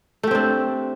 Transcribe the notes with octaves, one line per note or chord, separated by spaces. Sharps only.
A3 C4 D4 G4